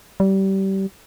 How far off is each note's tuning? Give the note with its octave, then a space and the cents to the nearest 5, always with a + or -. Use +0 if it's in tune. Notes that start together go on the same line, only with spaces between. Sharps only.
G3 -25